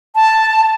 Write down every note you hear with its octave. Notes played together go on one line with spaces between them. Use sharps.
A5